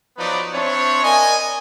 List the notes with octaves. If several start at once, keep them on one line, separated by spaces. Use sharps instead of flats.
F3 F#3 B3 D#4 B4 D5
C4 D4 E4 C#5
A#4 D5 D#5 G#5